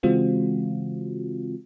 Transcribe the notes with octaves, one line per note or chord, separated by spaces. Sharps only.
C#3 E3 G#3 C4 F4 F#4